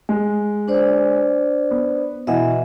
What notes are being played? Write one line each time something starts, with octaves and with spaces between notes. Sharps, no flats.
G#3
D4 C5 D5
B3
B2 E3 D#5 E5 F#5